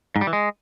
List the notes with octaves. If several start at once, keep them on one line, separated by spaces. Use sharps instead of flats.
G#2
G3
E3
G#3